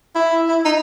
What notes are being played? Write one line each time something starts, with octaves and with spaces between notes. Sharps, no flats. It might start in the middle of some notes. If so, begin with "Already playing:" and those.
E4
E4
D#4